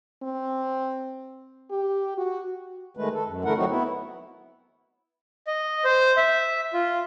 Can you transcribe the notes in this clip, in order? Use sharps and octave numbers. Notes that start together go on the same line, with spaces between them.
C4
G4
F#4
D#3 G#3 A3 B4
A4
F#2
D3 E3 A3 E4 A#4 F#5
F#3 A3 C4 D#4 F#4
B3 E4
D#5
C5
E5
F4